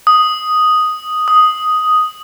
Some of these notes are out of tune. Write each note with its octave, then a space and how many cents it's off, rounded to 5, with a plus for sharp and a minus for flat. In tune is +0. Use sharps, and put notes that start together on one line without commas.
D#6 +0
D#6 +5